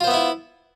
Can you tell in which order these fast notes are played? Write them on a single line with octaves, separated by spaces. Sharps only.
F4 C5 B3 E5 E4